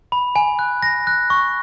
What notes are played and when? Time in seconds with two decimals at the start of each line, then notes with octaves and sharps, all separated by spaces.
0.12 B5
0.36 G#5
0.59 F#6
0.83 A#6
1.07 F#6
1.30 C#6